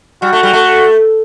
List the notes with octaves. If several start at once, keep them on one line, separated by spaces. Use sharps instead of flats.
G3 F#4
A3
G3
A3